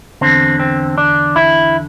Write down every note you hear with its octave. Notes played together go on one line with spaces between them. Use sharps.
E2 D3 C4
C4
D4
E4